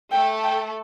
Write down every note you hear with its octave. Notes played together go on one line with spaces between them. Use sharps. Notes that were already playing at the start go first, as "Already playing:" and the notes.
A3 A4 G5
G5